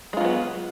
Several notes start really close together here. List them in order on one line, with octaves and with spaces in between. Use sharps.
G#3 F4 F#3 B3